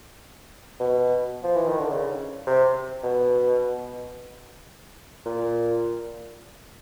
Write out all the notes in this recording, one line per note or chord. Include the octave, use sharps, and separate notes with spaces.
B2
F3
E3
D#3
D3
C#3
C3
B2
A#2